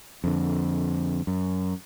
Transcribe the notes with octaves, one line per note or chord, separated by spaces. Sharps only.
F2 D3
F#2